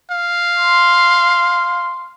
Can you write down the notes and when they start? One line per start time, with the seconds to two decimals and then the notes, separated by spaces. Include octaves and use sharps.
0.11 F5
0.58 C6